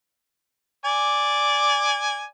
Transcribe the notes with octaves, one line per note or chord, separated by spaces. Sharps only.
D5 G#5